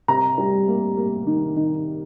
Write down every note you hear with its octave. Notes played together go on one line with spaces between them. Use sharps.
C3 A#5
G3
A#3
A#3
D#3
D#3